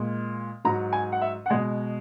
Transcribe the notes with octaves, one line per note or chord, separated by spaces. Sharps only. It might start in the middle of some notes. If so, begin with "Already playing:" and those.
Already playing: A#2 G#3
G#2 F#3 A#5
G#5
F#5
E5
F#5
B2 G#3 G#5